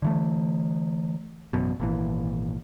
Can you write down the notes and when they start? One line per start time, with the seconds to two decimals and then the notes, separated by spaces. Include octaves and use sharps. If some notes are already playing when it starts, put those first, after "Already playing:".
0.02 D3 E3 A3
1.53 A1 F#2 B2
1.80 G#1 A#2 E3